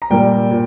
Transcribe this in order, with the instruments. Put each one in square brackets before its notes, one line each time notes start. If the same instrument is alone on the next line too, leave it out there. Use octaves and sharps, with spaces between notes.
[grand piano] A#5
A#2 G3 A#3 G5
A#2